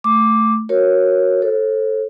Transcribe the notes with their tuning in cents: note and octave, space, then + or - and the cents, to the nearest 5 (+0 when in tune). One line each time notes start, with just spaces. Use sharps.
A3 +0 D6 +0
F#4 +0 A#4 +0 C#5 -15
A4 +0 C5 +45